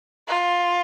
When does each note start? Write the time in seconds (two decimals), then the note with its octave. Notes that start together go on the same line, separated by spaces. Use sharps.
0.28 F4